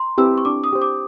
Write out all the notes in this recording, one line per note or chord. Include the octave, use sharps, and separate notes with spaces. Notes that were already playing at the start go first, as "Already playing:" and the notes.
Already playing: A#5 C6
C4 E4 G4 B4 E6
C#6
D4 D6
D#6
G4 C5
D6